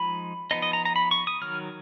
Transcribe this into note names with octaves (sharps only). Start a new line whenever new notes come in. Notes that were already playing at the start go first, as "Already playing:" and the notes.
Already playing: F3 G#3 D#4 B5
F3 B3 D#4 D#5
D#5
A#5
A#5
B5
C#6
D#6
D#3 F#3 F6